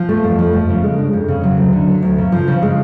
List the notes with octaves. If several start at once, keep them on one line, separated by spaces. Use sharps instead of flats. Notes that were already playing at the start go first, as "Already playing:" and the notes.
Already playing: F3
A3
F2
F3
A3
C#3
G#3
D4
F2
C#3
F#3
D2
D3
F#3
D2
C#3
F3
C#3
G#3